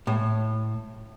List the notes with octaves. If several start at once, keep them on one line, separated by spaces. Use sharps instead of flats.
A2